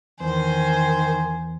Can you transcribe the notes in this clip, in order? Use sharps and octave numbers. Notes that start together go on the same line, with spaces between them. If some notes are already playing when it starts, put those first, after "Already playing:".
E2 D#3 C5 G#5